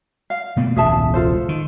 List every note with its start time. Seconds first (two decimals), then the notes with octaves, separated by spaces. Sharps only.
0.30 F5
0.57 B2 A3 A#3
0.76 E1 C#2 A2 G#4 E5 A5
1.14 F4 A4 C5
1.49 D#3